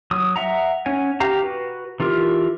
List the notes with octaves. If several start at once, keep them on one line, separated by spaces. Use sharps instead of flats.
F#3 D#6
E5 F#5 A#5
C#4 C#5 F#5 G#5
G4 F5 A#5
F#4 B4
E3 F4 G4 A#4